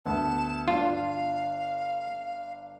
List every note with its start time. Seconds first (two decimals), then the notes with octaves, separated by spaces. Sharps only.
0.05 D2 B3 A5
0.68 G1 D4 F4 F5